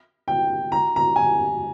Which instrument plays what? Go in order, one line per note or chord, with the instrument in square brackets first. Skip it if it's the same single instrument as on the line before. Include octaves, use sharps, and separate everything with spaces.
[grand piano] G5
A#5
A#5
G#5